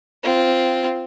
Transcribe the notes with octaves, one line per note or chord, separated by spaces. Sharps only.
C4 F4